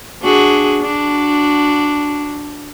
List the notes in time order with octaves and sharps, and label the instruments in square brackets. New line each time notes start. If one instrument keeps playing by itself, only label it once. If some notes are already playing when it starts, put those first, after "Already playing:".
[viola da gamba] D4 F#4 G#4
D4 F#4